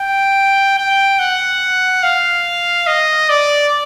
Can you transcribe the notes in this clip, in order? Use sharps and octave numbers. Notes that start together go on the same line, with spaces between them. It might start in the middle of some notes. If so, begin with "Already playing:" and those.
Already playing: G5
G5
F#5
F5
D#5
D5